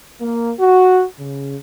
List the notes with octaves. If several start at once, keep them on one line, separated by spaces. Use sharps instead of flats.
A#3
F#4
C#3